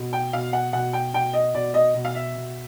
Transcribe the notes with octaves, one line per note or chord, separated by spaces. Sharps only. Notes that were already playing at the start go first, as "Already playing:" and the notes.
Already playing: B2
G5
B2 F5
F#5
B2 F#5
G5
B2 G5
D#5
B2 D5
D#5
B2
F5
E5
B2